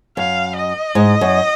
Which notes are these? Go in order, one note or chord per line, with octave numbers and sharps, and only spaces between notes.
F#2 F5
D#5
G#2
F#2